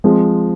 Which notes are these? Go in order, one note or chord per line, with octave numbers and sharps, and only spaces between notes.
F3 G#3 C4